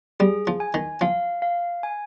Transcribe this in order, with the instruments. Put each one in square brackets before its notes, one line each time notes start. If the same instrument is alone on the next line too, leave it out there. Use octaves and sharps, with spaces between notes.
[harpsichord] G3 [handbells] G#4
[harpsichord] F3
[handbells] G#5
[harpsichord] D#3
[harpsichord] F3 [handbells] F5
[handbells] F5
G#5